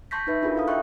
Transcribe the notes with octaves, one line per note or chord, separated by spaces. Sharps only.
A5 C6 C#6 G6 A#6 B6
D#4 B4 E5
D4 F4 F#4 G#4 A#4
E4 A4 F5 D#6
D#5 E5 G5 C6 C#6 F#6